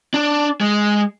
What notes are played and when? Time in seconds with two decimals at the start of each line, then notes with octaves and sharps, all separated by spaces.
0.14 D4
0.60 G#3